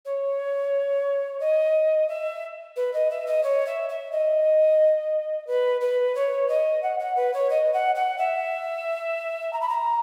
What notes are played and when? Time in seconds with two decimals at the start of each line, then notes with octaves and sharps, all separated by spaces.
0.05 C#5
1.40 D#5
2.09 E5
2.76 B4
2.93 D#5
3.10 E5
3.26 D#5
3.43 C#5
3.66 E5
3.89 E5
4.12 D#5
5.47 B4
5.81 B4
6.15 C#5
6.48 D#5
6.83 F#5
6.99 F#5
7.16 B4
7.33 C#5
7.50 D#5
7.73 F#5
7.95 F#5
8.18 E5
9.53 A#5
9.61 B5
9.69 A#5